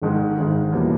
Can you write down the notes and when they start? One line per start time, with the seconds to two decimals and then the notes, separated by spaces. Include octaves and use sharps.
0.02 G#1 G#2 D#3 G#3
0.37 G#1 G#2 D#3 G#3
0.72 E2 B2 G3 A#3 C#4